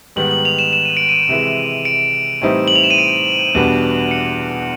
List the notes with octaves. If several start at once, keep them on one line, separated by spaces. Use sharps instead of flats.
G#2 D#3 G3 B3 F#7
F#7
F7
E7
E7
D#7
D7
D#7
C3 E3 G#3
D7
A2 E3 G3 C4 D#4
F#7
F7
E7
D#7
D7
E2 B2 G3 B3 D4
C#7